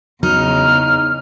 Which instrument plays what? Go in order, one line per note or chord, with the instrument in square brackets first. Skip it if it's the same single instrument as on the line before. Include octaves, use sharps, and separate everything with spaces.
[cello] E2 C#3 [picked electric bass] F#3 [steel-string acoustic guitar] D#4 [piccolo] F6